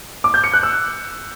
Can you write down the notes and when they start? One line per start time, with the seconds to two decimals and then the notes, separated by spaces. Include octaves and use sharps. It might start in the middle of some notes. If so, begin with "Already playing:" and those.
0.24 D6
0.34 G6
0.44 C#7
0.53 F#6
0.63 E6